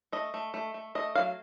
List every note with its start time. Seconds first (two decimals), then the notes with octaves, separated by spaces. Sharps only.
0.12 A3 D#5
0.34 A3
0.54 A3
0.74 A3
0.95 A3 D#5
1.15 F#3 F5